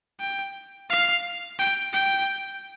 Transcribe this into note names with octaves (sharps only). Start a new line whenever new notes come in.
G5
F5
G5
G5